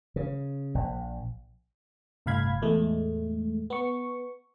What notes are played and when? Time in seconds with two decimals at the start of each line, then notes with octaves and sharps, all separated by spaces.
0.16 C#3
0.75 A#1
2.26 G1 C2 A2 F5 B5 G#6
2.62 E2 A2 G#3 A3
3.70 B3 C#6